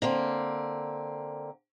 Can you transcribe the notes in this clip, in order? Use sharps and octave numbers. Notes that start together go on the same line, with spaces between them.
D3 A#3 C4